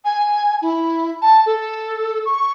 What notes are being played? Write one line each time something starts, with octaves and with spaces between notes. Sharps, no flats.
G#5
E4
A5
A4
C#6